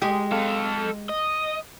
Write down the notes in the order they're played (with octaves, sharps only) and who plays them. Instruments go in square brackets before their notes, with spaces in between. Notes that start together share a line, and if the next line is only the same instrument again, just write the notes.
[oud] G#3 G4
[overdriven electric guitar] A4 F5
D#5